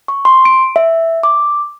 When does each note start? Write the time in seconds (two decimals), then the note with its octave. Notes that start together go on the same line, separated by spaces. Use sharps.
0.08 C#6
0.25 C6
0.45 D7
0.76 E5
1.23 D6